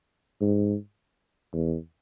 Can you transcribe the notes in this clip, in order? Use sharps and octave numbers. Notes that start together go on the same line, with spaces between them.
G#2
E2